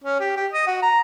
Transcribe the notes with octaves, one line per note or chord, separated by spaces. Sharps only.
C#4
G4
G4
D#5
F#4
A#5